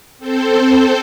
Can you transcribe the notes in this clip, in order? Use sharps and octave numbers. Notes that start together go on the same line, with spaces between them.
C4 A4 C5